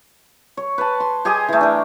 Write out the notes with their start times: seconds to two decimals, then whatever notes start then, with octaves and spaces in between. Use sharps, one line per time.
0.57 C#5
0.78 B4 A5
1.00 C6
1.25 G4 G#4 D#5 G#5
1.48 E3 A3
1.61 D4 A#4